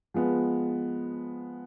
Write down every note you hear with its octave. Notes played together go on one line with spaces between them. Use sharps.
F3 G#3 B3